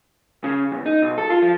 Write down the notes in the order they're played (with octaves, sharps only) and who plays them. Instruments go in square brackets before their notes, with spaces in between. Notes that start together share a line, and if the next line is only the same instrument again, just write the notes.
[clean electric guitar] C#3
E2
D#4
B1
A4
F4
F3